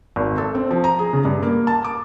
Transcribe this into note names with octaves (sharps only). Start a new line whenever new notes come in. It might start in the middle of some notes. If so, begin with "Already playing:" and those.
G#1
A4
C4
F3
A#5
G#4
C#3
G2
A#3
A5
D6